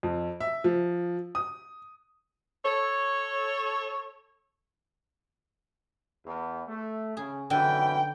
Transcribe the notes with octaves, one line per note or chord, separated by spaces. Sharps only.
F2
E5
F3
D#6
A4 C#5
E2
A3
C#3 G#4
B1 F#2 D3 E3 G5